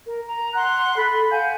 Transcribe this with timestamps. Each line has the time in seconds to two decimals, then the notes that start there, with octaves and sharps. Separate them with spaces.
0.05 A#4
0.27 A#5
0.55 F#5 C6 F#6
0.97 A4 B5
1.31 F5 F#5 G#5 G6